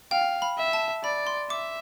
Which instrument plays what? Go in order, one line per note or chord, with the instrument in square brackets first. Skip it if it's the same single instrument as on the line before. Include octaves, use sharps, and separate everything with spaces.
[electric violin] F5 [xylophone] G5
[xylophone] B5
[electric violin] E5
[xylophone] A5
[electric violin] D5 [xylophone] B5
[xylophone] C6
[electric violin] E5 [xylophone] D6